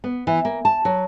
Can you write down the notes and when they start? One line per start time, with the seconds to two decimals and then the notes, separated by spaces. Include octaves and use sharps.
0.04 B3
0.27 E3
0.45 A#3
0.65 A5
0.85 F#3